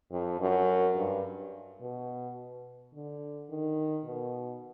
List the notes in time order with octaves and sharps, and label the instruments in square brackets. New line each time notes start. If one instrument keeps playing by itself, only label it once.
[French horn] F2
F#2
G2
B2
D3
D#3
B2